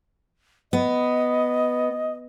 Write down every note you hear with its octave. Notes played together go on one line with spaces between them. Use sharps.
B3 D#5